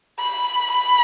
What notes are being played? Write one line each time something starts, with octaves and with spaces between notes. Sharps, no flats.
B5
B5